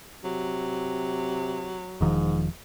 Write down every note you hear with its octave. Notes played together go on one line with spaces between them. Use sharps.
C3 F#3
E1 G#2 D#3 F3